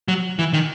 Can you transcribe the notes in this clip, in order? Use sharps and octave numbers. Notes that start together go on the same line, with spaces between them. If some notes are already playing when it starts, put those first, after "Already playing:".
F#3
E3
D#3